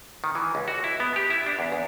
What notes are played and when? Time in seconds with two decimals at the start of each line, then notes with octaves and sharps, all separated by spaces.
0.24 D#3
0.35 E3
0.55 C#2
0.68 F#4
0.84 E4
1.00 B3
1.16 G4
1.30 E4
1.46 D4
1.59 E2
1.72 E2